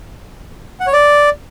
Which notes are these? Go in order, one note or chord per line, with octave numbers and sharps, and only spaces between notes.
F#5
C#5
D5